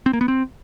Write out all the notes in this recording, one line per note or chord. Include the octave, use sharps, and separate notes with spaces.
C4
A#3
B3
C4